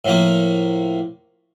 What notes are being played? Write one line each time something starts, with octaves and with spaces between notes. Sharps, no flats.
A2 F3 A#3